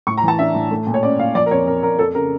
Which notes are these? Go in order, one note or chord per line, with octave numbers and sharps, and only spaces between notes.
A2 C#6
A#5
E3 A5
D4 E5
A2
A3
A#2
C#5
C#4 D5
A#2 F5
F3 D5
A#4
F2 C#5
F2 A#4
F2 A#4
F2 A4
C#3 A#4